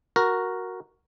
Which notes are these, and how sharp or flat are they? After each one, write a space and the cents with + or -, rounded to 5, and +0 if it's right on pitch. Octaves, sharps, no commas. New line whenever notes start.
F#4 +0 A#4 +0